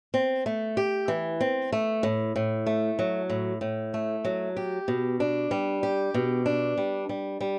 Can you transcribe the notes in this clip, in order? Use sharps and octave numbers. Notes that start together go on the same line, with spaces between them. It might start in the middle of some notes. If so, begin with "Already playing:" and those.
C4
A3
G4
E3
C4
A3
A2
A2
A3
F#3
A2
A2
A3
F#3
G4
B2
D4
G3
G4
B2
D4
G3
G3
G3